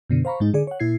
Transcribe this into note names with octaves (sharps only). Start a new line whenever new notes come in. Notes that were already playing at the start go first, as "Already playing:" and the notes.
F#2 B2 D3
C5 F5 A#5 B5 C#6
G#2 G#3 D#4
D3 G#4 D5
C#5 F#5
A#2 E4 G#6 C7